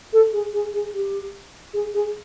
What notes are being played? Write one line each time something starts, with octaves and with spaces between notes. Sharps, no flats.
A4
G#4
G#4
G#4
G4
G#4
G#4